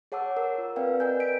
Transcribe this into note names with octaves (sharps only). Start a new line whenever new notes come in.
G#4 C#5 F#5 A5 D6 E6
A#4 E6
F4
C4 B4 D5 F5 G5
A#4 B4 D#5 G#5 G6
B6 D7